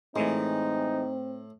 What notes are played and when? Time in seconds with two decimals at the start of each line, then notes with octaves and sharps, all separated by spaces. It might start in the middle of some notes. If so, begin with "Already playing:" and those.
0.16 A2 E3 G#3 C4 D#4